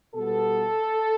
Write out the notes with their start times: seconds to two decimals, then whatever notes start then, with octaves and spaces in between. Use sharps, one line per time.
0.15 B2 G3 B3 A4